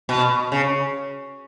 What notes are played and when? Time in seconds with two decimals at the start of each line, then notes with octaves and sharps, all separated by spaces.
0.09 B2
0.52 C#3